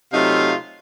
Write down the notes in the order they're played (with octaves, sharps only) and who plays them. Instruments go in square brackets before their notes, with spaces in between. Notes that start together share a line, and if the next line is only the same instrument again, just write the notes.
[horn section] C3 F#3 A3 D#4 F4 F5